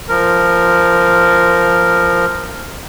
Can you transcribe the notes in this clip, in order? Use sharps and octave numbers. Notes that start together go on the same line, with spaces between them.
F3 A#4